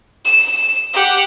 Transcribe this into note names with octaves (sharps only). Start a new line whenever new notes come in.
E7
G4 F#5